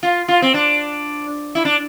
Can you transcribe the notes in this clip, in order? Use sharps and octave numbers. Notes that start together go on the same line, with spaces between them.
F4
F4
C4
D4
E4
D4